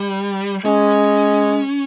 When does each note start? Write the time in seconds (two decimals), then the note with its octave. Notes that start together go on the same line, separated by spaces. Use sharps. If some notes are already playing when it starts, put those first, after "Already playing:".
Already playing: G3
0.65 G#3 C#4